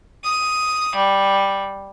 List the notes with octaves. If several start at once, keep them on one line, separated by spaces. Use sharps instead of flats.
D#6
G3